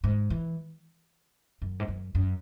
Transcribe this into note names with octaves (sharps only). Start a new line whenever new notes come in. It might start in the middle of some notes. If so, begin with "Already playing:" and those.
G#2
E3
F#2
G#2
F#2
F#2